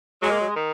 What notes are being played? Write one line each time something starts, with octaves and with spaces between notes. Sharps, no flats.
F#3 G#3
A#3
F#3
G#3
D#3